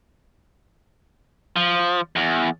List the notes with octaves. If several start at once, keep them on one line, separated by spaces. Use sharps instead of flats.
F3
E2